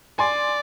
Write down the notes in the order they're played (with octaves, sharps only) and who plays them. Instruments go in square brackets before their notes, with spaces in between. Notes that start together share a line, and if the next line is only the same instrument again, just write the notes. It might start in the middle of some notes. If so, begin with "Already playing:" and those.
[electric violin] D5 [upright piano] G#5 C6